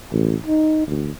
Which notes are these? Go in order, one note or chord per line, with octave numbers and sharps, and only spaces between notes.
A1
D#4
D2